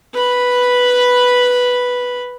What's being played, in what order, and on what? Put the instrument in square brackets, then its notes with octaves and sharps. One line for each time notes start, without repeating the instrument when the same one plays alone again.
[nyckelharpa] B4 B5